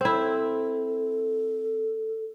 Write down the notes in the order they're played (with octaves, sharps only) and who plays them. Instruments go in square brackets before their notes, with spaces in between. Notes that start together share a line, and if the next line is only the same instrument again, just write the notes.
[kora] C4 E4 [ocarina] A4